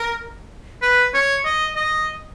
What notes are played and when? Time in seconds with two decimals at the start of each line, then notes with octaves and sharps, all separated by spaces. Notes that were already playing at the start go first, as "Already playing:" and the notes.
Already playing: A#4
0.82 B4
1.14 C#5
1.45 D#5
1.76 D#5